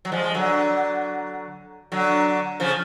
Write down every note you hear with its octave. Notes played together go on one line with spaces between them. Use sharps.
F#3
F3 G#3
G#3
D3 F#3
D3 F#3
C#3 F3